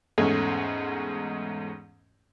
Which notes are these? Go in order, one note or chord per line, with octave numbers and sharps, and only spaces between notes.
E2 G#2 G#3 A3 C#4 G#6